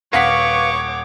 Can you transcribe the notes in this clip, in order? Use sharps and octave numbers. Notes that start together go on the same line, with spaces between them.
D#1 B4 C#5 F5 F#5 C#6 D6 B6